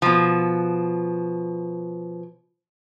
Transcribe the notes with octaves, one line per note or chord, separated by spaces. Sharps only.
B2 F3